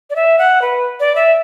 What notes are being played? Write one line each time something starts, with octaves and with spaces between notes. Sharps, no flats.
D5
E5
F#5
B4
D5
E5